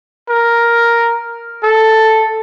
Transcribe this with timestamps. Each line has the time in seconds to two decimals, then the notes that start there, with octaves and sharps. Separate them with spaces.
0.29 A#4
1.63 A4